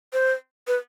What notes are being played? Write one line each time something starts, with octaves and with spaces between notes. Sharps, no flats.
C5
B4